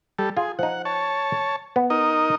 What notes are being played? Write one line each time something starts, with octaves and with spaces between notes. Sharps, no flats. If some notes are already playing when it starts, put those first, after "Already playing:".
G3 A4
F4 G#4
F3 D#4 F#5
C#5 A5
B3
D#4 A#4 D#5